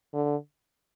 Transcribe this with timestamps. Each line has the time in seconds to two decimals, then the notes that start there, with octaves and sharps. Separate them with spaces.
0.14 D3